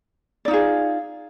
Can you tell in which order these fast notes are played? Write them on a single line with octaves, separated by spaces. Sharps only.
D5 D#4 F4 G#4